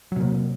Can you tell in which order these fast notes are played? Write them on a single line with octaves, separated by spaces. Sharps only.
F#3 C3 A#3